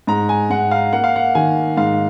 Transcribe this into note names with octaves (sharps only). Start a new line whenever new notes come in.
G#2 A#5
G#5
G#2 F#5
F5
A#3 F#5
F5
F#5
D#3 G#5
G#2 F5